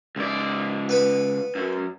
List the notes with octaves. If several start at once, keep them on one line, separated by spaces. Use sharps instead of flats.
C#2 D5
B3 B4 B5
F#2